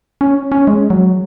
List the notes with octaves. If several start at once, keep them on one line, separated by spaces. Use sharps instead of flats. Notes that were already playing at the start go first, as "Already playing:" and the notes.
C#4
C#4
G#3
F#3